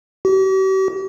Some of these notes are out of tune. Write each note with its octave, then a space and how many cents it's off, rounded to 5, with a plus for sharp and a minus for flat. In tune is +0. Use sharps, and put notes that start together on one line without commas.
G4 -45